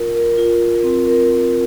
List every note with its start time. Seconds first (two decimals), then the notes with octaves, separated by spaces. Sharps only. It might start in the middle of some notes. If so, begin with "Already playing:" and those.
Already playing: F4 A#4
0.15 A#4
0.37 F4
0.61 A#4
0.84 C4
1.07 A#4
1.30 A#4